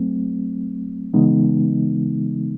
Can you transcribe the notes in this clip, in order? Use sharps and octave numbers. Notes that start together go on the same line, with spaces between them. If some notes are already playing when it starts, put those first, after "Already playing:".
Already playing: F#3 A3 C4
C#3 E3 G#3 B3 D#4